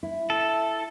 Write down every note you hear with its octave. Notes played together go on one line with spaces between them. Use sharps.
E4
A4